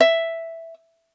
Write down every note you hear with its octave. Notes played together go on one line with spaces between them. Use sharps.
E5